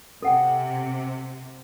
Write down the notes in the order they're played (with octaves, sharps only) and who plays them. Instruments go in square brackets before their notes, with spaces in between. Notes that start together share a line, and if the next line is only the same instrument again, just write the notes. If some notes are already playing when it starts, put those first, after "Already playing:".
[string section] C3 [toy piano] A4 F#5 G5